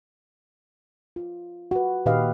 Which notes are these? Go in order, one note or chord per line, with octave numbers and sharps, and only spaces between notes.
F4
F#4 B4
A#2 D#3 G4 B4 D#5 F5